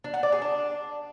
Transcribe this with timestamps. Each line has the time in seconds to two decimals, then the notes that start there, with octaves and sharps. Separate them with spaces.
0.04 D4
0.14 F#5
0.23 D5
0.32 G#4
0.42 D4